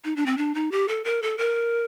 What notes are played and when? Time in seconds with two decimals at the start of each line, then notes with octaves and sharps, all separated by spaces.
0.04 D#4
0.16 D4
0.26 C4
0.37 D4
0.55 D#4
0.72 G4
0.88 A4
1.04 A#4
1.22 A4
1.38 A#4